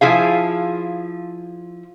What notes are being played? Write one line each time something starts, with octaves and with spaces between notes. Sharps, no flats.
F3 E4 G#4 F5